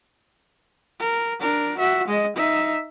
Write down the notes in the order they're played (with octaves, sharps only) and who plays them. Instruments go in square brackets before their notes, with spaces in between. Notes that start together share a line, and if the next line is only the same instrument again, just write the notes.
[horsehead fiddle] A#4
D4 A#4
F#4 E5
G#3 D#5
D#4 E5